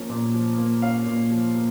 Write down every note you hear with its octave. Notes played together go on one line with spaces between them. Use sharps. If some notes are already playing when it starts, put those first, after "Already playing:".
Already playing: F3 A#3 C#4
A#2
F3
A#3
C#4 F5
A#2
F3
A#3